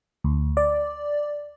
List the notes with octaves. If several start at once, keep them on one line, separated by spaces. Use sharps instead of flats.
D2
D5